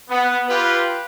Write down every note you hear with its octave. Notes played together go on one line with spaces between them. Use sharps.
B3
F4 G4 B4